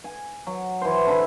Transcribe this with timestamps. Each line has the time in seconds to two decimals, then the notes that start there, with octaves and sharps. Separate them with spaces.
0.04 G#5
0.47 F#3
0.82 E3 C5
1.07 D3 E4 E5